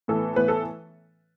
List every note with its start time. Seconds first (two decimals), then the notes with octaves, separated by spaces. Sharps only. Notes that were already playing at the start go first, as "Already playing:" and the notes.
0.08 A2 E3 B3 A4
0.36 A2 E3 B3 B4
0.48 A4